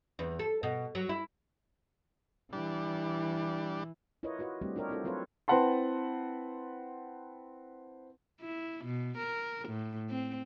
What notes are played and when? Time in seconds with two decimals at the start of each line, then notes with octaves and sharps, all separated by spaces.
0.19 E2
0.39 A4
0.63 B2
0.95 F#3
1.09 E4
2.53 E3 G3 D4
4.23 E4 F4 A#4 B4 C#5 D#5
4.39 F4 F#4 B4 D#5
4.61 G3 A3 C4 D4 G4
4.76 D4 F4 G4 A#4 C#5 D#5
4.89 C4 D#4 E4 F#4 A4 C5
5.04 F#3 C4 F4 A4 B4 C#5
5.48 C4 E4 B4 F#5 A5 C6
8.41 E4
8.85 B2
9.18 A#4
9.69 A2
10.09 C4